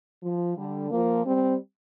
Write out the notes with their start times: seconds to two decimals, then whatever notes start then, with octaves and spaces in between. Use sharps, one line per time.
0.22 F3
0.56 D3 G3
0.90 F3 A#3
1.25 G3 C4